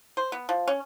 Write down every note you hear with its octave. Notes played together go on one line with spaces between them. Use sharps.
C5
B3
F3
C#4